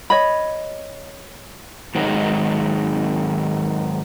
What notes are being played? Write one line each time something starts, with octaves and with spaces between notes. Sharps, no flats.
C#5 D#5 B5
G#2 D#3 F#3 G#3